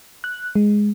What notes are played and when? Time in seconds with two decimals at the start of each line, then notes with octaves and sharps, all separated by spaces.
0.24 F#6
0.55 G#3